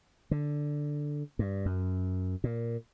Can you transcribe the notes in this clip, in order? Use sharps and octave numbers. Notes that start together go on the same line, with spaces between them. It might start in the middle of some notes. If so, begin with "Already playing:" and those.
D3
G2
F#2
A#2